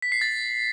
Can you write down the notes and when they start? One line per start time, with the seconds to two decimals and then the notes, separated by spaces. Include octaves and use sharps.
0.02 B6
0.12 C7
0.21 A6